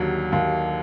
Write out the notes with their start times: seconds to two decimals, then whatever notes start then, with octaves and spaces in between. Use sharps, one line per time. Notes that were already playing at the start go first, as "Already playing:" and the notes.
Already playing: D#2 D3 F#3 G4
0.32 D#2